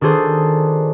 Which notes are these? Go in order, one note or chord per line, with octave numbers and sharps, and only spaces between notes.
D#3 D4 F#4 G#4 A4 C5